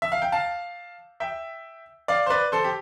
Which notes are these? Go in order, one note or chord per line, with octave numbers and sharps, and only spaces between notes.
E5
F5
G5
F5 A5
E5 G5
D5 F5
C5
B4 D5
A4 C5
G4